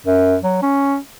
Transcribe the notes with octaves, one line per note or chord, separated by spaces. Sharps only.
F#2
F#3
C#4